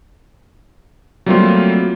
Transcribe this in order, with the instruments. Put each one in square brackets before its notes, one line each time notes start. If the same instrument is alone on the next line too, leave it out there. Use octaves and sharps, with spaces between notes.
[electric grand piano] F#3 G3 A3 A#3 C4 F4